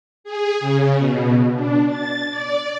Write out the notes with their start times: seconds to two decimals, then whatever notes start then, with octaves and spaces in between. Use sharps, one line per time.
0.24 G#4
0.60 C#3
0.97 B2
1.54 D4
1.88 A6
2.29 D5